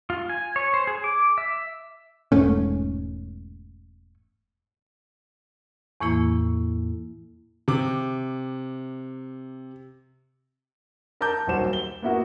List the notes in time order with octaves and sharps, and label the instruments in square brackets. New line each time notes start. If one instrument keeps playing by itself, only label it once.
[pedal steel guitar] F4
G#5
C#5
C5
G#4
D6
E5
[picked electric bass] E1 G#2 A3 C#4
[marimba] E2 A2 E3 A#3 E4
[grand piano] C3 D6
A#4 A5 A#5 D6 G6
D#1 B1 F#4 C5 E7
G7
A#3 B3 E4 F#4 A#4